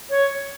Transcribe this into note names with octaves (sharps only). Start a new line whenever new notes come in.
C#5